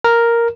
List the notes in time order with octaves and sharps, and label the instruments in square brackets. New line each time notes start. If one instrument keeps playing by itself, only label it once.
[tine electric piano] A#4